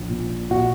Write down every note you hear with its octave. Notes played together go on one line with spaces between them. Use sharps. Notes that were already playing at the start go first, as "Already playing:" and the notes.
Already playing: A#1
A#2
A#2 F#4